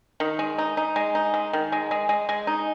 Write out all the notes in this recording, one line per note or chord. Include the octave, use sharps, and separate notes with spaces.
D#3
G#3
D#4
D#4
G#3
D#4
G#3
D#3
G#3
G#3
G#3
G#3
D#4